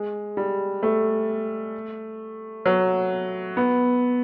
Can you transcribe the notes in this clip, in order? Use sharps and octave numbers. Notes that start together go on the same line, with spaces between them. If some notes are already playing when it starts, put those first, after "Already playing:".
Already playing: G#3
G3
A3
F#3
B3